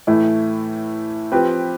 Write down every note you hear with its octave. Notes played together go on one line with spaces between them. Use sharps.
A2 E3 A3 E4
F3 C4 G4 B4